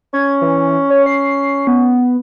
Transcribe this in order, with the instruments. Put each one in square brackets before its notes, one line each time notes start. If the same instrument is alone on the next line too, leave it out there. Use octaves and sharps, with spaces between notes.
[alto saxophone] C#4 [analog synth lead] G#6
[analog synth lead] E3
C#5
C7
B3